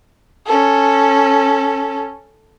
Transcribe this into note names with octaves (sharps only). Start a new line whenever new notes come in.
C#4 A4